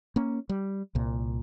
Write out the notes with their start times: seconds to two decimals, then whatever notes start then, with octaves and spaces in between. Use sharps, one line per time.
0.16 A#3 C#4
0.49 G3
0.95 C2 A#2